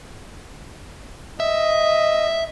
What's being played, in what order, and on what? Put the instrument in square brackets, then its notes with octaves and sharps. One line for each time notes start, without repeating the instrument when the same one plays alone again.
[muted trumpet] D#5 [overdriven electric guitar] E5